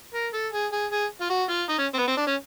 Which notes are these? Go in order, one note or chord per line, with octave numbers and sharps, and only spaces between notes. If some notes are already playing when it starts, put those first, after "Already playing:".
A#4
A4
G#4
G#4
G#4
F4
F#4
F4
D#4
C#4
C4
B3
C4
D4
C#4